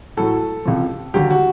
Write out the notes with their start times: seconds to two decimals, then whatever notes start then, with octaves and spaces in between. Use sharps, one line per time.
0.17 A2 F#3 A4
0.65 C#2 C3 F3
1.14 D#2 D3 F#3 G4
1.31 F#4